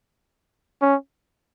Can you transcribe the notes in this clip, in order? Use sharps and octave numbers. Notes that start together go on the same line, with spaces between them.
C#4